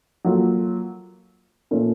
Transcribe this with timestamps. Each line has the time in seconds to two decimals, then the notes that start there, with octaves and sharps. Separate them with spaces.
0.25 F#3 A#3 F4 A4
1.71 A#2 A3 C#4 F4 A#4